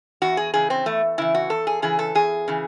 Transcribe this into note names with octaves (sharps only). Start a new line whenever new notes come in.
E2 F#4
G#4
C#3 E3 G#4
C4
E2 A3
C#3 E3 E4
F#4
E2 A4
G#4
C#3 E3 G#4
A4
E2 G#4
C#3 E3